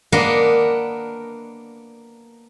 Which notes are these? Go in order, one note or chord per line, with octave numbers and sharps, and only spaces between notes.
A#3 B3 D4 A#4 D#5 F#5